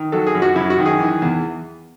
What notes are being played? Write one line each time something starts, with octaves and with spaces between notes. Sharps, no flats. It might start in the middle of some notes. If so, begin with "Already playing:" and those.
Already playing: D#3
F#3 A4
G#4
F#2
F#4
F#2 E4
F#4
D#3
G#4
E3
E2